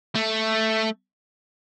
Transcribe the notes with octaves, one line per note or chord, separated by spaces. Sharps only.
A3